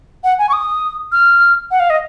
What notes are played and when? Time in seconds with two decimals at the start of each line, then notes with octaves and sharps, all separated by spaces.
0.24 F#5
0.38 G#5
0.49 C#6
0.53 D#6
1.12 F6
1.71 F#5
1.80 F5
1.90 D#5